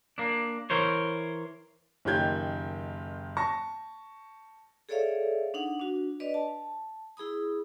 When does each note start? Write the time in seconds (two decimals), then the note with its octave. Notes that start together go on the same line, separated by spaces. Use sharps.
0.18 A#3 D4
0.70 E3 A#4 C5 C#5
2.05 F#1 D#3 F4 G4 G6 G#6
3.37 A5 C#6 A#6
4.89 G#4 A4 C#5 D5 E5 F5
5.54 D4 D#4 F#5
5.80 D4 F#4
6.20 D4 B4 D5 D#5
6.34 A5
7.17 E4 G#4 B5 D#6